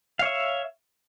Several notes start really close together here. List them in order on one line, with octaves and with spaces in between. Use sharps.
F5 C#5 E5